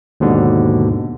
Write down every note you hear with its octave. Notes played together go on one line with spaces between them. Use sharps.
D#2 G#2 B2 D3